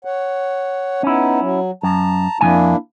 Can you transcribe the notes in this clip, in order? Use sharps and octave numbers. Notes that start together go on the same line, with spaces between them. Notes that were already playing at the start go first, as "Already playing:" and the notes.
C#5 F#5
B3 C#4 D#4 E4
F#3
F#2 A5 A#5
F2 E3 A#3 D4 E4 G#5